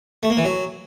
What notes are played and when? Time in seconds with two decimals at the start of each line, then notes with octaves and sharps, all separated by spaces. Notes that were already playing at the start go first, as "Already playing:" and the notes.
0.23 A3
0.30 A#3
0.37 E3
0.45 F#3